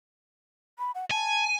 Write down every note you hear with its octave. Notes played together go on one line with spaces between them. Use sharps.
B5
F#5
G#5 A5